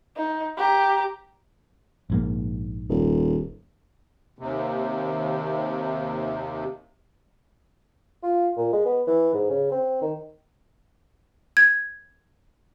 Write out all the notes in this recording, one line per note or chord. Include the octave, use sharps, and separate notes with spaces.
D#4
G4 A#5
A#1 G#2 A#3
D#1
D#2 C3
F4
A#2
G#3
B3
E3
G#2
C#3
C4
D#3
G#6